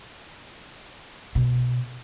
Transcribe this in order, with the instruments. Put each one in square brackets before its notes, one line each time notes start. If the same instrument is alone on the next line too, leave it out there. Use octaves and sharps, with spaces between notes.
[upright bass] B2